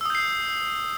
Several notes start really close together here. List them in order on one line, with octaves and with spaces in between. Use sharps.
E6 D#6 G6 C7